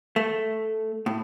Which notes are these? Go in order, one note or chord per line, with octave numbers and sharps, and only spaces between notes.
A3
A2